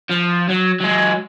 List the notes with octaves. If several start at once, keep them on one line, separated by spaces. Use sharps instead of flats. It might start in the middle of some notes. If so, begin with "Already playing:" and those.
F3
F#3
F#3 G#3